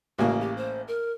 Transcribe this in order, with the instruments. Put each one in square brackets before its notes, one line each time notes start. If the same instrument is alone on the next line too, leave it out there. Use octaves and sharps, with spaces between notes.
[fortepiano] A1 C#3 A#3 [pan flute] F#4
[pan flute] G4
C5
A#4